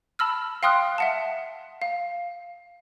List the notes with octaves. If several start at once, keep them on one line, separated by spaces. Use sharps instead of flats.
A5 B5 E6 F6
F5 G5 C6 D#6 F6 F#6
E5 F#5 A5
F5